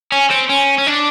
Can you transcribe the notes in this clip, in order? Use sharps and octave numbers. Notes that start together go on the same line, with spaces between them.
C#4
C4
C#4
C#4
D4